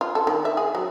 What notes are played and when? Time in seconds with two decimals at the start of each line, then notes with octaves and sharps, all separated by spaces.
0.01 F4
0.15 A4
0.27 D#3
0.45 E5
0.57 G#4
0.75 F#3